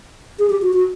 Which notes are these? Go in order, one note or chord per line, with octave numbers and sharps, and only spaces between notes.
G#4
G4
F#4
F#4